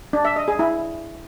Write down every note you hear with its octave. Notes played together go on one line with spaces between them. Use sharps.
D4
E5
D#5
G#4
E4